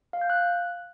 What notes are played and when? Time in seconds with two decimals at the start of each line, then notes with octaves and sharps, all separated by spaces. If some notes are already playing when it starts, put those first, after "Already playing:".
0.13 F5
0.21 G6
0.30 F#6